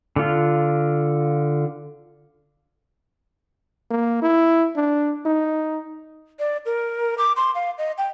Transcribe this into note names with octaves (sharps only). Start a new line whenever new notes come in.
D3 F4
A#3
E4
D4
D#4
D5
A#4
D6
C6
F5
D#5
G5